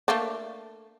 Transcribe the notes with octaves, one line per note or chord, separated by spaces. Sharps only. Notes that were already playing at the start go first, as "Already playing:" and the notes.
A3 A#3 D4